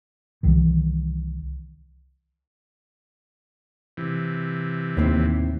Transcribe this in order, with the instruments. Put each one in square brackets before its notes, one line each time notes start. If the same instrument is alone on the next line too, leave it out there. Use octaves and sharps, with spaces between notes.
[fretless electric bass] C2 D#3 E3
[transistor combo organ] C3 E3
[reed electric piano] D#2 [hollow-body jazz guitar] A2 C4 E4